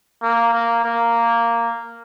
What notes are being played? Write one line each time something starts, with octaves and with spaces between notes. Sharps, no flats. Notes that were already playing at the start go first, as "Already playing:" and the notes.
A#3
A#3
A#3